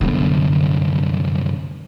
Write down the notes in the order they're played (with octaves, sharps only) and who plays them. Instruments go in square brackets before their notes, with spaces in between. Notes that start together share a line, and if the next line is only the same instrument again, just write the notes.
[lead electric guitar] C2 F#2 [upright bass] D3 B3